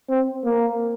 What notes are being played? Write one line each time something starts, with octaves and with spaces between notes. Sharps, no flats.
C4
A#3